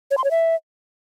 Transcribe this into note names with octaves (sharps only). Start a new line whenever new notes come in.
C#5
C6
C#5
E5